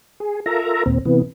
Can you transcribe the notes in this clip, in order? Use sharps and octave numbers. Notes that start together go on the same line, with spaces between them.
G#4
F4 A4 A#4 E5 A#5
D#2 A#2 C4
C3 E3 B3